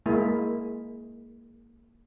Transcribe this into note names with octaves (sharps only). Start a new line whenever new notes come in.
G#3 A#3 E4